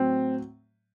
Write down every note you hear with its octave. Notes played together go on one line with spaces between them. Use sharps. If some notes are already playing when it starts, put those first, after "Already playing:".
Already playing: A2 F#3 C4